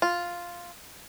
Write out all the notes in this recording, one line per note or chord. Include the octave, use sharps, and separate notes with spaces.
F4